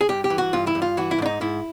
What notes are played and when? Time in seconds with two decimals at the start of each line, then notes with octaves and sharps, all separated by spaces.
0.01 G#4
0.09 G2 G4
0.24 G4
0.30 E3
0.38 F#4
0.53 G2 F4
0.67 E4
0.75 G2
0.82 F4
0.97 E3 F#4
1.11 E4
1.18 G#2 D4
1.26 D#4
1.41 G#2 E4